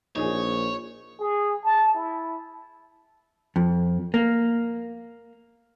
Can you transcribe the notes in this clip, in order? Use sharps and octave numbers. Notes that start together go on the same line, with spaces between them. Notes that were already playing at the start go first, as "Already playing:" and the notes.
A#1 D#4 G#4 C#5
G#4
A5
E4
F2
A#3